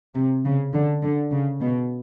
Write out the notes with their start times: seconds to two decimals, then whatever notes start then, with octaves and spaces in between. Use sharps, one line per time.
0.15 C3
0.45 C#3
0.73 D3
1.03 D3
1.31 C#3
1.60 B2